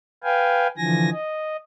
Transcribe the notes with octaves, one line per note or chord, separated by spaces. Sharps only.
B4 F5 G5 G#5
D3 E3 F3 G#5 A#6
D#5